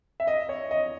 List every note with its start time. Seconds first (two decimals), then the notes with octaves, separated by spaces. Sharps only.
0.20 E5
0.27 D#5
0.49 C#5
0.71 D#5